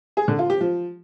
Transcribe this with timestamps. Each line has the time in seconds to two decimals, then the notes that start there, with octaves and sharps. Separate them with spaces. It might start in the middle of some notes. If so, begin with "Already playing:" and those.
0.17 G#4
0.28 D3
0.39 F4
0.50 G4
0.61 F3